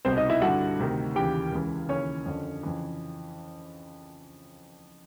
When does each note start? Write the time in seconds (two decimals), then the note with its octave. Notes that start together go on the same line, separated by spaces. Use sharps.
0.05 C2 B2 C4 C5
0.17 D#4 D#5
0.30 E4 E5
0.42 G2 D3 F#4 F#5
0.79 D2 C3 D#3
1.15 D#2 C#3 E3 G4 G5
1.52 C#2 C#3 E3
1.89 D#2 C#3 E3 C#4 C#5
2.26 F2 D3
2.63 F2 C#3 E3